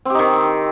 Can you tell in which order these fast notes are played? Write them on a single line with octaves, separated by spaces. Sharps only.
C4 G4 D#4 D#3